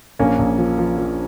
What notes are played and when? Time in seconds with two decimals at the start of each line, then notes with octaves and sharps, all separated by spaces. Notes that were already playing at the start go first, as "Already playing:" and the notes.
0.19 A#1 A#3 C#4
0.39 A#1
0.58 F3
0.78 F3
0.97 F3